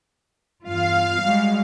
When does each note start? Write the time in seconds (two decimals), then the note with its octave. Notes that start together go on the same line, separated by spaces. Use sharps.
0.64 E2 G2 F4 F5
1.21 G3 G#3 F#4